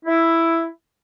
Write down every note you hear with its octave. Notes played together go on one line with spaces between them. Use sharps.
E4